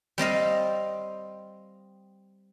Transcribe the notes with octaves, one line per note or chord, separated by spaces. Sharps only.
G3 C4 D#5 F5